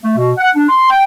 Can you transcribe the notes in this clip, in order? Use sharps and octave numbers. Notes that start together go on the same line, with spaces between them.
A3
B2
F#5
D4
C6
G5